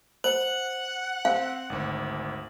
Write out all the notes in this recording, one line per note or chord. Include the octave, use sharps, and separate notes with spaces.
C5 F#5 F#7
C4 F5
G#1 D2